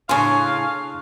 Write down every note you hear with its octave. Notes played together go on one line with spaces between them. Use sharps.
A2 C#3 D4 F5 G#5 C6 C#6